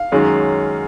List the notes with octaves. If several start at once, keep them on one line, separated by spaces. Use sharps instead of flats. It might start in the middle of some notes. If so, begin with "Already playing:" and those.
Already playing: F5
F#2 D#3 G#3 C#4